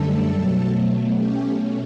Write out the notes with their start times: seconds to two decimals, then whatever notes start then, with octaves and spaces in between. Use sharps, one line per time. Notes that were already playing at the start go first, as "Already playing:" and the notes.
Already playing: F#2 D3 G3 A3 A4
0.35 B2 F#3 A3
1.15 B2 A3 C#4 G4